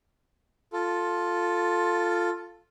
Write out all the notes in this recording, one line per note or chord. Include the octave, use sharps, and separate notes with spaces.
F4 A4